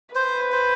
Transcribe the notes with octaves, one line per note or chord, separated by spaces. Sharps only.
B4 C5
C5